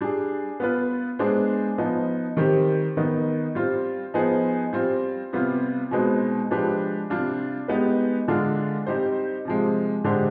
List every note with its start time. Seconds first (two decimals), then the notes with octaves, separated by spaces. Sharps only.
0.01 G3 D4 G#4
0.60 B3 F4 B4
1.19 G#3 B3 D4 G#4 C5
1.78 F3 B3 D#4
2.37 D#3 G3 C4 G4
2.97 D#3 B3 D#4
3.55 G3 C4 F4
4.14 F3 B3 D#4 G#4 C5
4.73 G3 C4 F4
5.33 C3 G3 B3 F4
5.91 B2 G#3 C4 D#4 B4
6.51 F3 G#3 D4 G4 B4
7.10 C3 G3 D4 F4
7.68 G#3 B3 D#4 G4 B4
8.28 D3 G#3 D4 F4
8.86 G3 C4 D#4 G4 C5
9.45 C3 F3 G#3
10.04 D3 G#3 D4 G4 C5